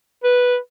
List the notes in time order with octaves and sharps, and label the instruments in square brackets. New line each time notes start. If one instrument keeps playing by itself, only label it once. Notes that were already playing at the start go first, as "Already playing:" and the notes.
[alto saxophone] B4